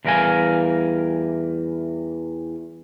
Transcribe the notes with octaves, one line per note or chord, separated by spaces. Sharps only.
E2 E3 G3 A#4 F5 G#5